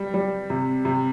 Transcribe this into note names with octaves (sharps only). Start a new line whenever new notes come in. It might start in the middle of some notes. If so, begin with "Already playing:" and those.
Already playing: G3
G3
C3
C3